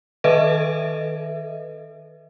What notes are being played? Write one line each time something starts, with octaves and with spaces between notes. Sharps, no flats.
D#3 A4 B4 D#5 E5